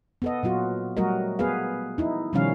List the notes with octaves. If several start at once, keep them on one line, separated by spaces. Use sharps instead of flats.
B3 A4 D#5
A#2 F#3 F4 F#4
F#3 G3 A3 F#4 A#4 D#5
B3 F#4 G#4 B4 F5
D#4 E4
B2 D#3 F3 G3 C#4 F5